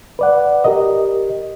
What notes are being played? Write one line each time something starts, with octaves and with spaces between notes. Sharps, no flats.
B4 D5 F#5
G4 A#4 D#5